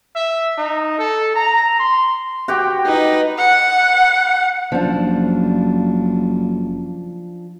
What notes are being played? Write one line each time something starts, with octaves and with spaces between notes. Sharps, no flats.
E5
D#4
A4
A#5
C6
F#4 G4 G5
D#4 B4
F#5
F#1 F3 D4